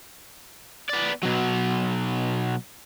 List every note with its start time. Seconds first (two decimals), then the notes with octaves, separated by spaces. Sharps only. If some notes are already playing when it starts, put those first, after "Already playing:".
0.89 B3 D5
1.23 B2 F#3